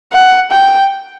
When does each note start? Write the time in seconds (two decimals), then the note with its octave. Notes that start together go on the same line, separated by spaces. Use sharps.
0.12 F#5
0.51 G5